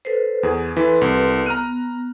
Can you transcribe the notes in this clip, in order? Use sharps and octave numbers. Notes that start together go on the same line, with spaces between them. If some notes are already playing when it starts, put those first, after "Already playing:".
A4 B4 C5
E2 G#4
E3 A4 B4 C6
C2
B3 A#5 F6 F#6